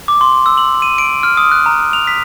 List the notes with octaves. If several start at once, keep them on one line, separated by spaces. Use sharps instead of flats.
D6
C6
E6
F#7
D#7
D7
F6
D#6
F#6
A#5
F7
B6